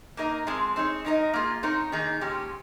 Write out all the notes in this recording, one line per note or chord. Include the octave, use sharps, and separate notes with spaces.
A#3 D#4 A#4 D#5
F3 G#3 C4
C4 D#4 G#4 C#5
G#3 D#4 A#4 D#5
A#3 F4 G#4
C4 D#4 A#4 C#5
D#3 A#3 D#4 G#4
A#2 F3 G#3 C#4 G4